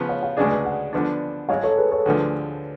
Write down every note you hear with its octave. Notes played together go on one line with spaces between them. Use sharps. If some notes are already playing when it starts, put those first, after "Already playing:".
Already playing: C#3 F3 B3
C#5 F5
C#5 F5
D2 C#3 G#3 D4 G#4 B4 D5
B4 D5
D5 F#5
D3 F3 B3 D4
G#1 G#2 G#3 C#5 F5
A4 C#5
G#4 B4
A4 C#5
D2 D3 F3 G#4 B4